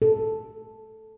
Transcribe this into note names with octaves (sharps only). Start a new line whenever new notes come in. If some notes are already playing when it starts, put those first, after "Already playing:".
A4